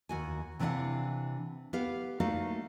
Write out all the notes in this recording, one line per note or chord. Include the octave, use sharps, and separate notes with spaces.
D#2 F#4 G#5
C3 E3 D4 C5 F5 F#5
B3 G4 F5
A3 A#3 D#4 F#4 D5 F5